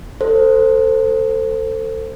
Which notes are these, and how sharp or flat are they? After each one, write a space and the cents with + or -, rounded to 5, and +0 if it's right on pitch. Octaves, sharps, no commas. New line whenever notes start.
A4 +30 C5 +0